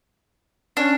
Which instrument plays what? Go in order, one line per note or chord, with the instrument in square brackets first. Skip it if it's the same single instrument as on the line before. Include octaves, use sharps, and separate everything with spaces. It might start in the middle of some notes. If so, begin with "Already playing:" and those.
[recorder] C#4 [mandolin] D4